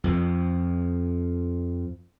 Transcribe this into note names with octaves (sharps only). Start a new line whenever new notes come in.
F2 F3